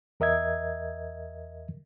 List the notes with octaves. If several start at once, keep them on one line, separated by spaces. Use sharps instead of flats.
E2 A#4 D#5 E5 G#6